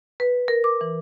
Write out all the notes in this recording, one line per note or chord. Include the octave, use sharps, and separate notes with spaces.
B4
A#4
D6
E3